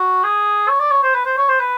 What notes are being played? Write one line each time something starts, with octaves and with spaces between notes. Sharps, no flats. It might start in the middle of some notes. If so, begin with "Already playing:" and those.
Already playing: F#4
G#4
C#5
D5
C#5
C5
B4
C5
C#5
C5
B4